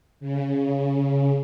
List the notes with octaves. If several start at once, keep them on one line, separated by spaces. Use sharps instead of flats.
C#3